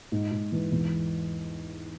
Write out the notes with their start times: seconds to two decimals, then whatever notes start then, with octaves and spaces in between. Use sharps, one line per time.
0.12 G#2
0.31 G#2
0.52 E3
0.72 E2